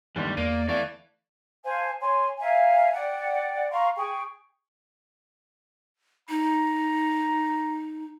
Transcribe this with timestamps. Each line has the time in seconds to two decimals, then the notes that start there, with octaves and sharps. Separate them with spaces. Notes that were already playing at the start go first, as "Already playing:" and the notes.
0.16 G1 D#2 G#2 E3 G3
0.37 E2 A#3 D5 D#7
0.68 E3 A3 D5 F5
1.64 C5 F5 G#5 A5
2.01 C#5 G#5 C6
2.39 E5 F5 G#5 A#5
2.93 D5 F#5 G5
3.70 F5 A#5 C6 C#6
3.96 G#4 G5 C#6
6.29 D#4 A#5